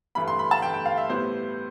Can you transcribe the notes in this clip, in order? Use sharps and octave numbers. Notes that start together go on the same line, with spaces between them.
G2 E3 A3 B5
C6
B5
A5
G2 E3 A3 G5
G5
F5
E5
A2 G3 B3 E4 C5